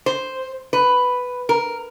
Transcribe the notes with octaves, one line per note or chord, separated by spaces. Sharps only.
C5
B4
A#4